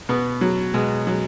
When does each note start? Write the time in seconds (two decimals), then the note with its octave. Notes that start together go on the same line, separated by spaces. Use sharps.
0.09 B2 B3
0.41 F#3
0.74 B2 G#3
1.07 F#3